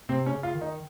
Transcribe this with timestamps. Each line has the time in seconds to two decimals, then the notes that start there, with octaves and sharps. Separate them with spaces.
0.09 C3 C4
0.26 C#4
0.32 C#3
0.43 F4
0.55 D#3
0.61 D#4